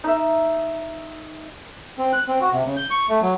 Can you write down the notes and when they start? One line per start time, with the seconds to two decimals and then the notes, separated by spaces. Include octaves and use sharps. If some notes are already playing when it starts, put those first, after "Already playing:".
0.04 D#4 E5
1.98 C4
2.13 F#6
2.28 C4
2.41 F#4
2.52 C3
2.65 C#3
2.77 G6
2.91 C#6
3.09 A3
3.22 F#3